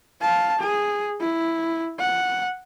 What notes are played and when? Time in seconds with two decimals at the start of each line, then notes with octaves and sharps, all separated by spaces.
0.21 F5 A5
0.58 G#4
1.20 E4
1.99 F#5